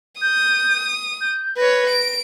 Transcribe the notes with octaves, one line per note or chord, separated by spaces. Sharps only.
D#6 G6
G6
B4 C#5 A#6
D7